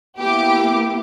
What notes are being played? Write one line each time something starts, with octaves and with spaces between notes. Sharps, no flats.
A#3 B3 E4 G4 D6